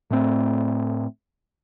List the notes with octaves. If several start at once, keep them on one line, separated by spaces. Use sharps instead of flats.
A2 A3 C4